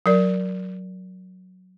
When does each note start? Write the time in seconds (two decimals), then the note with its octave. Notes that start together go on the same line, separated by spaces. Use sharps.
0.06 F#3 A#4 D5